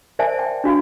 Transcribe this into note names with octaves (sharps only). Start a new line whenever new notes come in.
A#4 C5 D5 E5 G#5 A5
G5
D4 F#4 F5 B5